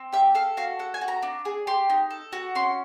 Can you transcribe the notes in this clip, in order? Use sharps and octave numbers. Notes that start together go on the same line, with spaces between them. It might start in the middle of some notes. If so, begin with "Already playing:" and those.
Already playing: C4
G4 E5
A4 F5
F#4 F5
A4 F#5
G#5
F#4
A#5
D4
G#4
G4 C6
D#4
A4
F#4
C#4 C6